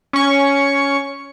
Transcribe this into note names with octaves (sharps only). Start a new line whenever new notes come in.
C#4 C#6